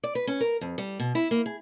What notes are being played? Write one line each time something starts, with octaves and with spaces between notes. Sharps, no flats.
D5
B4
C#4
A#4
F2
G3
B2
E4
A#3
G#4